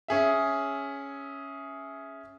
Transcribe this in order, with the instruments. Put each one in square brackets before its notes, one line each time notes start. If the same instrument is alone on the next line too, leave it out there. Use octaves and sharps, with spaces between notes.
[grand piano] C#4 G#4 E5